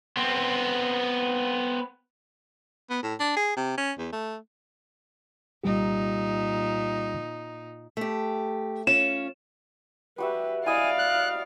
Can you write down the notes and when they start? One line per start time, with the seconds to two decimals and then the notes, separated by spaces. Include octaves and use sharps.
0.17 B3 C4
2.90 B3
3.03 A2
3.20 D4
3.37 G#4
3.57 C3
3.77 C#4
3.98 E2
4.12 A3
5.64 C2 A#2 G3 D#4 G4
7.97 A3 G4
8.87 C#4 F4 C#5 E7
10.18 G3 F#4 G4 B4 E5
10.66 E4 D5 D#5 F5 G#5 B5
10.98 F#6